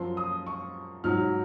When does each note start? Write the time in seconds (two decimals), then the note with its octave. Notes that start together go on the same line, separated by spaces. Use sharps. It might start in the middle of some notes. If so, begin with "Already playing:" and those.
Already playing: F#2 F3 C6
0.17 D#6
0.47 C#6
1.04 G#2 F#3 F6